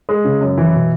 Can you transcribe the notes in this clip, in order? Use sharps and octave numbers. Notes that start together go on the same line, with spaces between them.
G#3
C#3
F#2
E3
B2